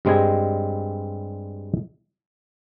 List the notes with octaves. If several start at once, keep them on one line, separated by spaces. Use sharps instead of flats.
G2 G3 G#3 C4 D#5 G#5